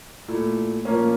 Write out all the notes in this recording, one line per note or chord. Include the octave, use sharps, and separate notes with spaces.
A#2 A3 E4
A#2 F3 A#3 C#4